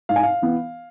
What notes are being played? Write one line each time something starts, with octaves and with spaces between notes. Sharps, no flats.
G#2 F5
G#5
F5
E3 B3